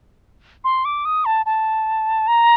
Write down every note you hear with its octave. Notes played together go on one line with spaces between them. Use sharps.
C6
D6
D#6
A5
A5
A#5